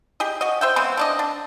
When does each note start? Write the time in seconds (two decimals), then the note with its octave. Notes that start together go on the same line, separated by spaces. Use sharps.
0.20 G4 G#4 D#5
0.41 F#4 D#5
0.61 C5 E5 G5
0.76 C#3 G#3 B3 C4
0.97 D3 D4 D#5
1.19 D4